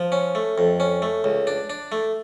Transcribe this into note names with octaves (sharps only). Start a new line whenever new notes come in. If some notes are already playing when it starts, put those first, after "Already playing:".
Already playing: F3
C#4
A3
F2
C#4
A3
C#2
D4
D4
A3